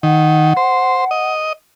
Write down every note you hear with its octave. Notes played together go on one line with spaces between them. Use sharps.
D#3 F#5
C5
D#5